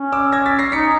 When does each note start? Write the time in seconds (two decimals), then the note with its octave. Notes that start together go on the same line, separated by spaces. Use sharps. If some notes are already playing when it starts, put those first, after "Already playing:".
Already playing: C#4
0.12 D6 E6
0.32 G#6 A#6
0.46 A6 B6
0.59 A#6 C7
0.72 D#4 B6 C#7